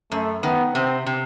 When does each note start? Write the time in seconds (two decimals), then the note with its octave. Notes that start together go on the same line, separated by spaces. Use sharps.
0.12 F#2 A3
0.43 D#3 B3
0.75 C3 C4
1.06 C3